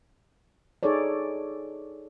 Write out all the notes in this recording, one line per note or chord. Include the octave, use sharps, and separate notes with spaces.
D#4 G#4 A4 C#5 D5